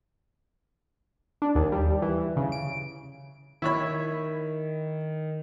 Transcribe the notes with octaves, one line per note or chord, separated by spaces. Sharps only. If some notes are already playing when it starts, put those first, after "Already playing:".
D4
D#2
G3
E3
C#3
D7
D#3 E4 C#5 B5